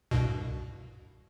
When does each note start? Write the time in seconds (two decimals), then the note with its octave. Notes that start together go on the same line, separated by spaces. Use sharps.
0.11 C2 G2 B2